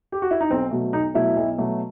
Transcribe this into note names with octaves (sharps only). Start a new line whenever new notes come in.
G4
F#4
E4
D#4
B1 C4
B2 F#3 A3
B1 D#4
B2 F#3 A3 E4
B1
B2 F#3 A3